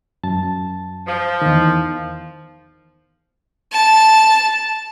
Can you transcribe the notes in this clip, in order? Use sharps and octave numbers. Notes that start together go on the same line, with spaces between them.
F#2 A5 A6
F3
E2 D#3
A5